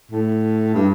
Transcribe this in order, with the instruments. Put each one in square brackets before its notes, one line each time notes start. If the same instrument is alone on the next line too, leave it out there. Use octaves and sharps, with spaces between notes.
[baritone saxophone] A2
G2